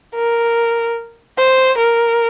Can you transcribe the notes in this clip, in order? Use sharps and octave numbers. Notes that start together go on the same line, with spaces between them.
A#4
C5
A#4